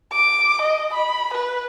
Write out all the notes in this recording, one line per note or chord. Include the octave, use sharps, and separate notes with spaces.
D6
D#5
B5
B4